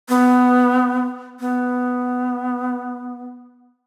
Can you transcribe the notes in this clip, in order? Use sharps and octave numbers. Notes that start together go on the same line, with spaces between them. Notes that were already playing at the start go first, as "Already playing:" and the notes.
B3
B3